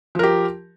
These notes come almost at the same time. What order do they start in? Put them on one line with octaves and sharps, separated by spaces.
F3 A#4 G4